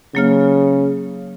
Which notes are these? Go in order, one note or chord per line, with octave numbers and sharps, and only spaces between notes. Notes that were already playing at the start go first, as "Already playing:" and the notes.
C#3 F#3 A#3 F6